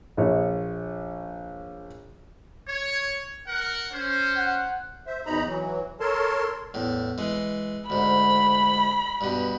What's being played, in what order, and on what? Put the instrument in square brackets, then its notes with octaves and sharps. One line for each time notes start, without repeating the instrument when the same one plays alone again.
[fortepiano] A#1 C#5
[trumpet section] C#5
A#4 F#5
C#4 C5
[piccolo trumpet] F#5
[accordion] C5 E5
E2 B2 D#4 A#5 B5
E3 F#3
A4 A#4 C#5 A5 C6
[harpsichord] E2 A2
E3 G#3
[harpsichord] D2 G#2 [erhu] B5
[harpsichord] G2 B2